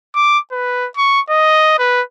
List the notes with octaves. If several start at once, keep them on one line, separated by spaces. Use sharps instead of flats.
D6
B4
C#6
D#5
B4